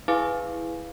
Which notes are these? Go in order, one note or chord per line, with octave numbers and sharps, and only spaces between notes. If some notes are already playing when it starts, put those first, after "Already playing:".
E4 G#4 B4 F5 G#5 D6